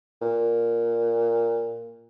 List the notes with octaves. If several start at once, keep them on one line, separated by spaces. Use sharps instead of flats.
A#2